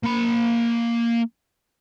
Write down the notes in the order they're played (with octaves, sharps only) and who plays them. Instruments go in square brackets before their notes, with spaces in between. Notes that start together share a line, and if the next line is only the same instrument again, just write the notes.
[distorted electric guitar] A#3 B5